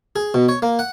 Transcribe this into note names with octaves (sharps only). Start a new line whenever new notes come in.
G#4
B2
C#5
A#3
F#5